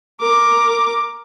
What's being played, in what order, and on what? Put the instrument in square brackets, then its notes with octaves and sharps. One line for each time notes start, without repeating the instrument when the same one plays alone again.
[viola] A#4 D6